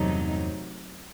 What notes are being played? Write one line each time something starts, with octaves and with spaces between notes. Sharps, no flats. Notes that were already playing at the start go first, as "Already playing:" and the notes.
Already playing: E2 G2 C3 F#3 A3 D#4